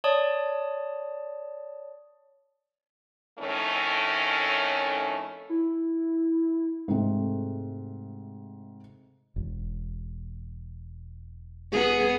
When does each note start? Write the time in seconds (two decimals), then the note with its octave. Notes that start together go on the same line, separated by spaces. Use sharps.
0.04 C#5 D5 A5 D#6
3.39 F2 A2 D#3 A3 C#4
5.50 E4
6.88 G#2 C3 G#3 A3 C4
9.36 E1
11.72 B3 G#4